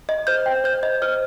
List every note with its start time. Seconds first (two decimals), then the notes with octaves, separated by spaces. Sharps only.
0.09 D#5
0.27 C5 G6
0.46 G5
0.64 C5 G6
0.83 D#5
1.02 C5 F6